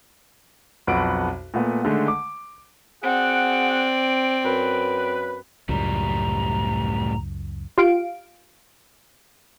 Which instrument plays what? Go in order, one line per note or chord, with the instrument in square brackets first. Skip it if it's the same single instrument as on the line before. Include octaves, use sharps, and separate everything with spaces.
[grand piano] B1 F2 B4 F#5 D7
A#2 A3 B3
D3 D#3 G#3 A3
D6
[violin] C4 D5 [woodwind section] F#4 G#4 F#5
[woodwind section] F#2 B4
[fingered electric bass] C#2 F#2 [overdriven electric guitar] A2 G3 [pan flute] A#5
[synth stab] F4 G4 F5 D7